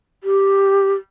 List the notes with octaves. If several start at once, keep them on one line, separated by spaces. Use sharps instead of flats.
G4